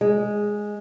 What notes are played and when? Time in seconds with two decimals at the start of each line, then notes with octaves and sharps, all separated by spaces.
0.01 G#3